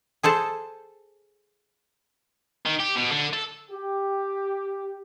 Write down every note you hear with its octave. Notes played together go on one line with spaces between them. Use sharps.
G#4 A4 C5 A5
D#3
G4
B2
D3
A4
G4